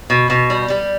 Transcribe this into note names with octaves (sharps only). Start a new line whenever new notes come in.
B2
B2
G3
G3